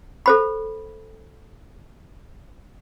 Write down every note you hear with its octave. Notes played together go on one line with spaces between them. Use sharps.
A4 C5 B5